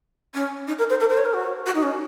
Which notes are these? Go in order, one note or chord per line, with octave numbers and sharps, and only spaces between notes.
C#4
D#4
A#4
C5
A#4
C5
C#5
A#4
F#4
F#4
D#4
C#4